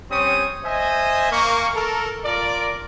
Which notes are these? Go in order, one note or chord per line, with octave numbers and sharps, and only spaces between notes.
G3 C4 C#4 C#5 D#6
C5 D#5 E5 G#5
A#3 C#6
A4 A#4
F4 A#4 D5